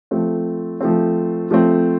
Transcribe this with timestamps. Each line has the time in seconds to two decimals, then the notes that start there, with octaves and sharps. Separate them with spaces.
0.11 F3 A3 C4
0.81 F3 A3 C4
1.51 F3 A3 C4